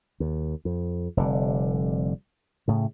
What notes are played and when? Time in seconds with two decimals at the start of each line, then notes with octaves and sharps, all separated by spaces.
0.20 D#2
0.65 F2
1.17 F1 D3 G3
2.68 A2 C#3